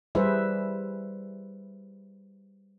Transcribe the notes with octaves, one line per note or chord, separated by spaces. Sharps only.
G3 E4 G#4 B4 C5 E5